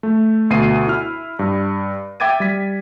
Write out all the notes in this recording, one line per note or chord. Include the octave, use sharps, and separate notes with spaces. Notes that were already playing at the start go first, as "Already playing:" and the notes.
A3
D2 B2 C7 D#7
E4 F6
G2
E5 G5 D6 G#6 A6 D#7
G3 B6